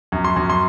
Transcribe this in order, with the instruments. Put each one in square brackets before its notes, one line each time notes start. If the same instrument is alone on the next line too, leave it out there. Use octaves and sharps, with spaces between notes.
[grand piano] F#2
C6
F#2
C6